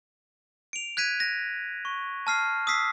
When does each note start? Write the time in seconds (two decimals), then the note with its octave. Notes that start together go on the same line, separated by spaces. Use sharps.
0.73 D7 F7
0.97 F#6 G#6 B6 D#7
1.20 A#6
1.85 C#6
2.27 A5 F6 C7
2.67 D#6 E6 B6 C7